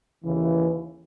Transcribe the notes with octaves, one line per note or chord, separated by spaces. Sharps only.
D#2 C#3 E3